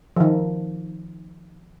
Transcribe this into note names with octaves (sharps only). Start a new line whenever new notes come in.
D#3 F3